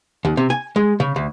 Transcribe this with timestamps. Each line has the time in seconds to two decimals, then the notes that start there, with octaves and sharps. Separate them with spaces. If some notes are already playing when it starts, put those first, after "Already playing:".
0.25 D#2
0.37 C3
0.50 G#5
0.76 G#3
1.00 C#3
1.16 D2